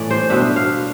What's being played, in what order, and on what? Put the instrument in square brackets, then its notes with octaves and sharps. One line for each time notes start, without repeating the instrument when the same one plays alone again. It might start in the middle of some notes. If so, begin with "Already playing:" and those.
Already playing: [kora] A2 E3 A3 D5
C5
B2 B3 D4 E5
F5